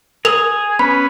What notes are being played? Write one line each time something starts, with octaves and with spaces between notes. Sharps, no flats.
G#4 A#4 F7
B3 C#4 B4 B5